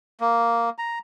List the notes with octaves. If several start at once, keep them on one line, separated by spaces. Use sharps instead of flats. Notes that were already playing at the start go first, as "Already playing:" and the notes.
A#3
A#5